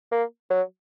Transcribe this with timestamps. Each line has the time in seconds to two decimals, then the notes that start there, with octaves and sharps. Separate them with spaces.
0.12 A#3
0.50 F#3